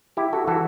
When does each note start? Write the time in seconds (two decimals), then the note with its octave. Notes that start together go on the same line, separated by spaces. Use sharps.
0.17 E4 G4
0.33 F#4 A4
0.47 E3 F#4 A4